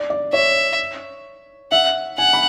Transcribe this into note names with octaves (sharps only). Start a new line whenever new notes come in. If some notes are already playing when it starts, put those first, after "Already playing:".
Already playing: D5
D5
C#5 E5
E5 F#5
F#5 G#5
B5